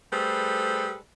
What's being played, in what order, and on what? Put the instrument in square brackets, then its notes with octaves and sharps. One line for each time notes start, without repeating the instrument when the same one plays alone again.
[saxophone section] G3 A3 G#4 A4 B4 C5